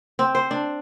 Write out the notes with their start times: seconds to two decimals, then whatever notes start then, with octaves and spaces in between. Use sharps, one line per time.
0.19 C4
0.35 C5
0.51 D4